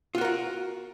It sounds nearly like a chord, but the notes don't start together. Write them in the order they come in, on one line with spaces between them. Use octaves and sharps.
F4 F#4 A#4 F#5